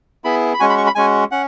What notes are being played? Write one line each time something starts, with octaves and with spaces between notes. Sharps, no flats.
B3 E4 G#4 B5
B5
G#3 C#4 F#4 G#5
B5
C#6
B5
G#3 C#4 F#4 G#5
C#4 F#5